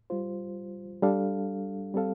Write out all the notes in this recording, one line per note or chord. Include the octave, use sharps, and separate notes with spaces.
G3 F4 C5
G3 D4 A4 F5
G3 C4 A4 F5